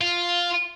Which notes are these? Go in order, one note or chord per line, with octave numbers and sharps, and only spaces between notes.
F4